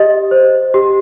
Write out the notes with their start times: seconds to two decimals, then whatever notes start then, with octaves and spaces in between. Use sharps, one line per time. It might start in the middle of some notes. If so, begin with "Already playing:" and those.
Already playing: G4 D#5
0.31 C5
0.74 G4